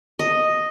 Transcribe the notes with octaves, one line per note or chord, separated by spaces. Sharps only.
D#5